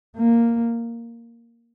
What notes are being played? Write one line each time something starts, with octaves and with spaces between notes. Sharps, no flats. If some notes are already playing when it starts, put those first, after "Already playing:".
A#3